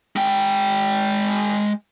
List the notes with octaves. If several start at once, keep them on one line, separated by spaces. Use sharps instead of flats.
G#3 G5